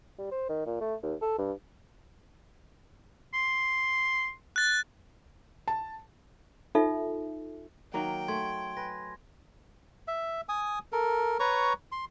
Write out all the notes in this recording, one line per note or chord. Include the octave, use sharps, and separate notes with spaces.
G3
C5
D#3
A#2
A3
D#2
A4
G2
C6
F#6 A6
A5
D#4 F4 A4 E5
D#3 F#3 A#3 G5
A3 C6 G#6
B4 G#5 A#6
E5
G#5 D#6
A4 A#4
B4 C#5 A#5 C#6
C6